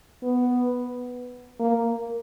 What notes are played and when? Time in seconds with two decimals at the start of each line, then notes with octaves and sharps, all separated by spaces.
0.23 B3
1.60 A#3